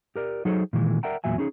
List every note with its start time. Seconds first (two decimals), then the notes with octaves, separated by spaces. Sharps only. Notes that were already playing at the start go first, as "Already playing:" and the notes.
0.16 G4 A#4 D5
0.45 F#3 D#4 G#4 A4 C5 C#5
0.73 A#2 D#3 E3 G#3
1.03 A#4 D5 E5 F#5 G5 A#5
1.24 E2 A#2 F#3 E5 G#5
1.38 C#4 D#4 G#4 C5 C#5